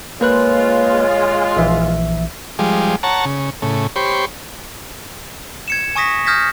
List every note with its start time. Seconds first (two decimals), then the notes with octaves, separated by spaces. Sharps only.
0.21 A#2 G#3 A#3 F4 B4 C#5 F#6
1.57 A#1 E3 E5
2.59 F3 G3 G#3
3.03 C#5 F#5 A5 A#5
3.25 C#3
3.62 A2 C#3
3.96 G4 C5 C#5 B5
5.68 G#6 C#7 E7
5.96 G#5 C#6 D#6 A#6 B6
6.26 D#6 F6 G6 G#6 A#6 B6